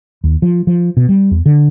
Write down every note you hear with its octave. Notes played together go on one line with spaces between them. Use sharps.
D#2
F3
F3
B2
G3
E2
D3